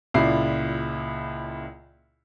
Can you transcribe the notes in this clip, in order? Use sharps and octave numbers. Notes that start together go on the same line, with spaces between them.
C#2 A#2 E4 D5 C7